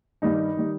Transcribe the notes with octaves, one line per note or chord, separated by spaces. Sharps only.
G2 D#3 G3 D#4
D#3 G3